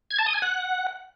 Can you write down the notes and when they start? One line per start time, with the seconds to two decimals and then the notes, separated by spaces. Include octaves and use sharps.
0.11 G#6
0.18 A5
0.26 D#6
0.34 G#5
0.42 F#5